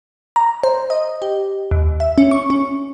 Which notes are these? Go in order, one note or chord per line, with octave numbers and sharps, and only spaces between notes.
A#5
C5
D#5
G4
D#2
E5
C#4
C#6
C#4